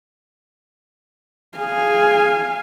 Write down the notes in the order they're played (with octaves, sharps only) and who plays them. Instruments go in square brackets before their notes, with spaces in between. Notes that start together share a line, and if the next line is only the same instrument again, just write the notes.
[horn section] G#4 [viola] F5 [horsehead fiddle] G#5